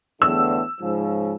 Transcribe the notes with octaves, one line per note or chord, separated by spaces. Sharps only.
E2 A2 D3 E6
G#2 C#3 F3